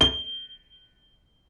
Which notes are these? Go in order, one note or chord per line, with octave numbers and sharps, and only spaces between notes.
G7